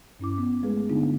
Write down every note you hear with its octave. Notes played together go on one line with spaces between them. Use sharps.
G2 C#4 E4 D6
B3
G#3 A3 G#4 B4
D3 B3 D4 D#4 F4